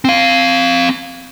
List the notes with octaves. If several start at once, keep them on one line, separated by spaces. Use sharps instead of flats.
C4 F5